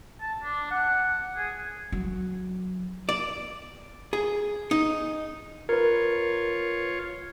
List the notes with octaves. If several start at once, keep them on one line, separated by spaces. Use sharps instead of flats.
A5
D4
F#5
G#4
F#3
D5
G#4
D#4
F4 A#4 B4 C#5